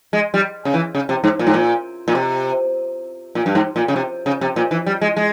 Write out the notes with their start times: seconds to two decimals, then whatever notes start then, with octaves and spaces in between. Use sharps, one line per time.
0.13 G#3
0.34 G3
0.65 C#3
0.74 E3
0.95 C#3
1.09 C3
1.24 G#2
1.39 A#2
1.47 G#2
1.54 A#2
2.08 A#2
2.15 C3
3.35 A#2
3.46 G2
3.55 G#2
3.76 A#2
3.88 C#3
3.96 C3
4.26 C#3
4.41 C3
4.56 A#2
4.71 E3
4.86 G3
5.01 G#3
5.17 G#3